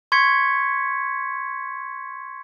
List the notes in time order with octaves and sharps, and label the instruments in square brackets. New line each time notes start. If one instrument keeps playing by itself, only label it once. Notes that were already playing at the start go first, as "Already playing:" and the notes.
[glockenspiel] C6 C#6 G#6 B6 C#7